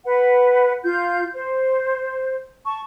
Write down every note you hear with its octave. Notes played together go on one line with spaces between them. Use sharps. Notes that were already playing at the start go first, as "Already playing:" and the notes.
B4 F#5
F4 G6
C5
A5 C#6